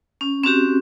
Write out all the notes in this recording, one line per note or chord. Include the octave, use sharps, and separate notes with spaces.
C#4
C4 C#4 F#4 G4